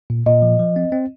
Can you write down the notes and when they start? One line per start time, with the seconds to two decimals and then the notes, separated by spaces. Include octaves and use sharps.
0.10 A#2
0.26 A#2 D#5
0.42 F3
0.59 F3
0.76 C4
0.92 C4